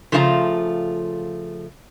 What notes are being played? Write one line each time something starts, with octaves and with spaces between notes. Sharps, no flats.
C#3 F3 A3 F4 C5 A#5